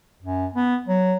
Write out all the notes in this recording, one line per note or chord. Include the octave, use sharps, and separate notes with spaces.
F#2
B3
F#3